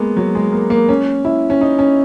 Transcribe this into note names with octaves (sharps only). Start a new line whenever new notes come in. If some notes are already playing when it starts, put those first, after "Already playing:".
Already playing: G#3 A#3 B3
F#3
G#3
A#3
A#3
C#4
E4
C#4
D#4
C#4